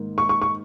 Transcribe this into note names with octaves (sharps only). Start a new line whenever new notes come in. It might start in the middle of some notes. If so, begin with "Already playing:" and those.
Already playing: G#2 D#3 A#3
C#6
C#6
C#6